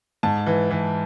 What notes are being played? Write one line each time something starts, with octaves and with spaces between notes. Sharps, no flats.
G#2 A5
E3
E3